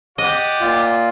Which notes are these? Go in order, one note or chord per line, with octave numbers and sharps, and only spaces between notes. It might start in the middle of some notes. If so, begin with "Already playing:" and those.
G4 D5 D#5 F#5
A#2 F4